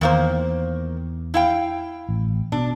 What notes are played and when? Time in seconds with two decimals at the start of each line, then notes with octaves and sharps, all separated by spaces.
0.01 E2 D#3 A#3 C5
1.34 E4 F5 G5
2.09 A1
2.52 B2 D4